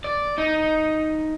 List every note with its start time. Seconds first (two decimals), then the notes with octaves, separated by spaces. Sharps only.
0.04 D5
0.38 D#4